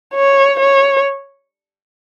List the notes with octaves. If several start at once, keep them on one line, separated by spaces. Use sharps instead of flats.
C#5
C#5